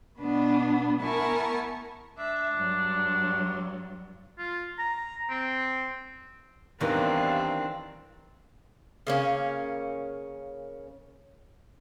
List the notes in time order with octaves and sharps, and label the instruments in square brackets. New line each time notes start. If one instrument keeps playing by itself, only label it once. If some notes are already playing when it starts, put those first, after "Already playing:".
[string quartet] B2 B3 D4
B3 E4 A#4 G#5 A5 C#6
[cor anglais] D4 [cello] E5
[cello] G2 F#3
[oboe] F4
A#5
C4
[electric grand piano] E2 G2 G3 [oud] D#3 E3 [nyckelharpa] C4 D4 [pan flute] F5
[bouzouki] C#3 A#3 C#4